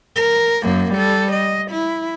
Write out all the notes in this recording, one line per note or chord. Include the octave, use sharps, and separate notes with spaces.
A#4
F#2 A#3
G3 A4
D#5
E4